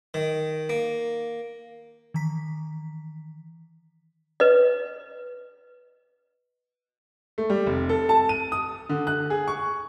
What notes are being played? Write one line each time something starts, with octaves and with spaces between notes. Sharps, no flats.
D#3
A#3
D#3 E3 A#5 B6
B4 D#5
A3
G3
F1
A4
A5
D#7
D#6
D3
F#6
G#4
C#6